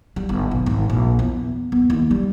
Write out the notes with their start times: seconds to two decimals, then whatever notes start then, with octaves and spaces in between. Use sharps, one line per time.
0.16 G3
0.29 G1
0.51 B1
0.66 G#1
0.90 A#1
1.19 E2
1.72 B3
1.90 D#2
2.11 G3